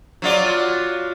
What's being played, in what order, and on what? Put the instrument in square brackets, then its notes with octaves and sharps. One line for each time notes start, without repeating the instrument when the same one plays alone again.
[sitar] F#3 F4 D5